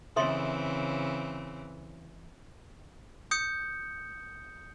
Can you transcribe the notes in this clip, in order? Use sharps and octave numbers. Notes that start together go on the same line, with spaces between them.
C#3 E3 C4 A4 E5 C6
D#6 G6 C#7